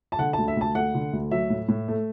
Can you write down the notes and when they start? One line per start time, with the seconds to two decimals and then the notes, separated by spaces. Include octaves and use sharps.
0.12 A5
0.18 D3 F#5
0.33 A5
0.38 D2
0.48 E5
0.57 D2 A5
0.75 A3 F#5
0.95 D3
1.13 D2
1.31 F#3 E5
1.50 A2
1.68 A2
1.88 A3